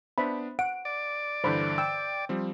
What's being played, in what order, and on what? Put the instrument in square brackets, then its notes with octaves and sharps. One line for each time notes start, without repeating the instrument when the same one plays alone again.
[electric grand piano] B3 D4 [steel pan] C5 E5 B5
[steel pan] F#5 [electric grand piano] D7
[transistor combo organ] D5
[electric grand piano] G2 D3 E3 [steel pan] C5 B5
[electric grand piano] G5 [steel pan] E6
[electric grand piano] F3 G3 C4